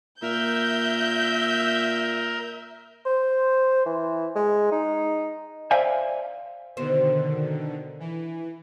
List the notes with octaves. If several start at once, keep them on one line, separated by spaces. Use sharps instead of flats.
A#2 A#4 E5 G6
C5
E3
G#3
D#4
C5 D5 E5 F5 G#5
B2 D3 D#3 C5
E3